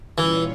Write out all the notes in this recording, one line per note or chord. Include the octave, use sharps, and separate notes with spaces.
A#2 E3 G3 C#4 F4 C#5